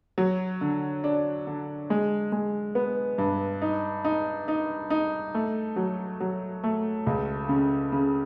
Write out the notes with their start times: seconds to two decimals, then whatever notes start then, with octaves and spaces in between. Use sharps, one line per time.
0.18 F#3
0.61 D3
1.04 D4
1.47 D3
1.90 G#3
2.32 G#3
2.75 B3
3.18 G2
3.62 D#4
4.05 D#4
4.48 D#4
4.90 D#4
5.34 A3
5.76 F#3
6.20 F#3
6.64 A3
7.06 C#2
7.49 C#3
7.92 C#3